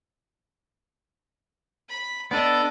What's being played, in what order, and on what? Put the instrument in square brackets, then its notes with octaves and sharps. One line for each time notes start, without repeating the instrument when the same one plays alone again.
[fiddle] B5
[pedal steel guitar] B3 D4 A4 [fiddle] D5 D#5